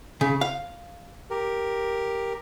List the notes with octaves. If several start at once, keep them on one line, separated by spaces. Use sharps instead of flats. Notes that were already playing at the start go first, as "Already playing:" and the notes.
C#3
F5
G4 A#4